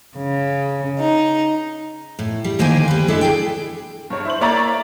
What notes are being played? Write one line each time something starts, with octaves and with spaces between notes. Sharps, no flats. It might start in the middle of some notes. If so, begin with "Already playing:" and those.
C#3
D#4
A2
G3
D2 D#3 A#3 F4 C5 G#5
G3 B4
G#3 D4 E4 A4
G#4 D5 G5
G2 C#5
E4 C5 F#7
A#3 C#5 D5 E5 A#5 A6